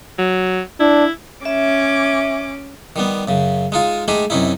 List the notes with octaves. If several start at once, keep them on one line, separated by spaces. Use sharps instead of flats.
F#3
D4 E4
C#4 E5 D6
D#3 G3 B3
F#2 C#3
G#3 D#4 F4
G#3 A3 D#4 G4 G#4
F#2 C3 C#4 D#4 E4